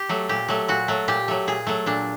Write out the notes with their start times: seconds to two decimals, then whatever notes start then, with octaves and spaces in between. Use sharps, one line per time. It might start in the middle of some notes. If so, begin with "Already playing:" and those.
Already playing: G4
0.09 F#3 A3
0.29 A#2 G4
0.48 F#3 A3
0.68 A#2 F#4
0.88 F#3 A3
1.08 A#2 G4
1.28 F#3 A3
1.47 A#2 G#4
1.67 F#3 A3
1.86 A#2 D4